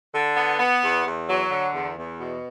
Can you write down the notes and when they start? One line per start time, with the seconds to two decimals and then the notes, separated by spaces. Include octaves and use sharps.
0.14 D3
0.36 B3
0.59 B3
0.82 E2
1.05 E2
1.29 F#3
1.51 D3
1.74 E2
1.97 E2
2.19 B2